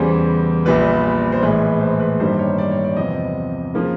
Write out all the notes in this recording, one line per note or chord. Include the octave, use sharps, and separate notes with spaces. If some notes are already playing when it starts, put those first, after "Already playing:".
Already playing: E2 C#3 E3 G3 C5
A#1 A#2 G3 B3 B4
C5
A#1 A2 E3 G#3 B4
C5
B4
G2 D#3 G3 A#3 C5
C#5
D5
C#5
D5
E2 C3 F3 D#5
C#3 F3 A#3